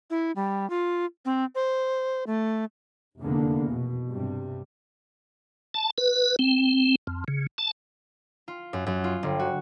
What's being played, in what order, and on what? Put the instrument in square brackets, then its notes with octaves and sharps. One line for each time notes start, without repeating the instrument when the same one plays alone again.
[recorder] E4
G3
F4
C4
C5
A3
[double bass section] F1 E2 D3 A#3 B3
B2
G2 C3 G3
[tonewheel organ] A5
B4
C4
F2
C#3
A5
[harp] F4
F#2
F#2
F4
G1
F#4